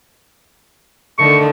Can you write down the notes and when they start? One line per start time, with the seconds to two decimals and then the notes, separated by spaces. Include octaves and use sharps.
1.19 D3 D#3 A3 C#6